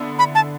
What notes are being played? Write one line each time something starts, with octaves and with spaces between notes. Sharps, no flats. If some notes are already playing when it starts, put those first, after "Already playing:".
Already playing: D3 B3 E4
B5
A5